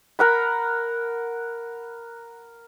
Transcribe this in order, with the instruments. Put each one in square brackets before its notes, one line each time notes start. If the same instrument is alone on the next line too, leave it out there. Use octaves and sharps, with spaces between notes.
[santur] A#4 F#5 B5